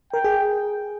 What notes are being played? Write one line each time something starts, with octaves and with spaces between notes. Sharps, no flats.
A#4 G5
G#4